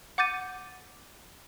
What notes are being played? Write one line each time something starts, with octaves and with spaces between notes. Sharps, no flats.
F#5 D6 G6 A6 D#7